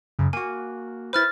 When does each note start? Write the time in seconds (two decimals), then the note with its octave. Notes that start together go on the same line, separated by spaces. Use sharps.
0.19 F#2 C#3
0.33 A#3 F#4 G#5
1.13 E4 B4 C5 F6 A6